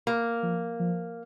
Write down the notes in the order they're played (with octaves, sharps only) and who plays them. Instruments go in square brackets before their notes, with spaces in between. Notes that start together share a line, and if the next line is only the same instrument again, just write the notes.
[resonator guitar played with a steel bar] A#3
[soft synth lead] F3
F3